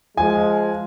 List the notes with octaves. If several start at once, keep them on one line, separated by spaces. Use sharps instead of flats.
F3 G#3 G#5